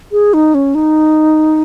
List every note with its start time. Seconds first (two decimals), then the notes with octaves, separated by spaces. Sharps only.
0.12 G#4
0.33 D#4
0.54 C#4
0.75 D#4